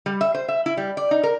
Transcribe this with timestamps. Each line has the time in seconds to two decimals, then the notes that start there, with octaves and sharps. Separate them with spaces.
0.06 G3
0.21 E5
0.34 C5
0.48 E5
0.66 E4
0.77 G3
0.97 D5
1.11 D#4
1.23 A#4